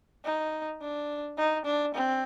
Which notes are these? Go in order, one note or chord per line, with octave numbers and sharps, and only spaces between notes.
D#4
D4
D#4
D4
C4